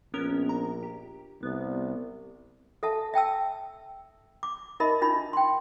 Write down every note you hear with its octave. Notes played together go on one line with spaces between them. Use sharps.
A#1 B3 C#4 A#4
A#5
G4
C2 B3
A4 E5 A5
E5 G5 A5 E6
D6
D#4 A#4 D#5 E5 B5
D4 D#4 F4 B5
G5 C6